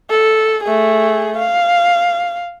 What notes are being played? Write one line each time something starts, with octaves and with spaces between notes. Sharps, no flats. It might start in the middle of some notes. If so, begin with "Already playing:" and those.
A4
A3 G#4
F5